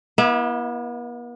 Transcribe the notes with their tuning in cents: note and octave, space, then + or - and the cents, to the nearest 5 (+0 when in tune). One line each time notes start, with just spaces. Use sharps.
B3 -45 E4 +0 E5 -25